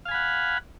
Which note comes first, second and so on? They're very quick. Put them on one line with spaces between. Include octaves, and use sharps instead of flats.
F5 G#5 B5 F#5